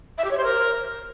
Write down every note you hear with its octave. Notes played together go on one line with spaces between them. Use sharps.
E5
G4
C#5
C5
A#4